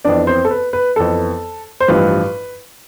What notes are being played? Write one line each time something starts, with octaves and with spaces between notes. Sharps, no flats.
F2 E3 B3 D4 D5
C4 C5
A4
B4
B4
F2 E3 B3 A4
C5
A1 G2 F3 B4